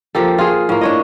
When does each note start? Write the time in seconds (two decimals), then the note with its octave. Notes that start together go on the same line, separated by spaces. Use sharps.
0.15 F3 A#3 G4 A4
0.38 F4 G#4
0.69 A2 A#3
0.81 D4 C#5 D#5